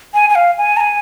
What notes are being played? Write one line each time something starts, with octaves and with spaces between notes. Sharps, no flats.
G#5
G#5
F5
G#5
A#5
G#5